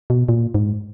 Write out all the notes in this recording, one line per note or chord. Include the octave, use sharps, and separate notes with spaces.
B2
A#2
G#2